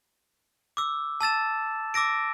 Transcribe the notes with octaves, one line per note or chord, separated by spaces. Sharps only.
D6 E6
A5 E6 A6 E7
D6 E6 A#6 D7